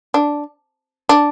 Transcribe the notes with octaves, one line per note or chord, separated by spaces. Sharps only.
D4
D4